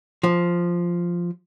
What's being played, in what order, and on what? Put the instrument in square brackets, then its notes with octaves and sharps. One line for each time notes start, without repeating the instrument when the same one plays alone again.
[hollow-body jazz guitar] F3